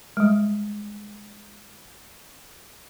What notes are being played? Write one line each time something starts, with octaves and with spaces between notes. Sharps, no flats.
G3 G#3